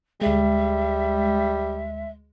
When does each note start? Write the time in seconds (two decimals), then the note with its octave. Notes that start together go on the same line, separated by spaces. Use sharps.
0.21 D2 G3 G#3 E5